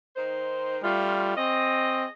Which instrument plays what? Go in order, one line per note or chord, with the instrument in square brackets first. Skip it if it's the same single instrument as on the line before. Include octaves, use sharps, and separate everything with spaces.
[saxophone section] D#3 D#4 C5
[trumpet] G3 [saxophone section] A3 C#4 F4
[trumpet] C4 [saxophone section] G#4 C#5 D#5